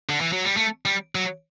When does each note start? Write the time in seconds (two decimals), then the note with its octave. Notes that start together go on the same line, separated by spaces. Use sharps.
0.09 D3
0.21 E3
0.33 F#3
0.45 G3
0.57 A3
0.85 G3
1.15 F#3